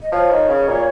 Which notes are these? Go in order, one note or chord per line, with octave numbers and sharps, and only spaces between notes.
D#5
F3 C#5
D#3
C#3
A#2